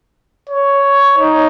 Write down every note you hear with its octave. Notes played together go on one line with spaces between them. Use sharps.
C#5
D#4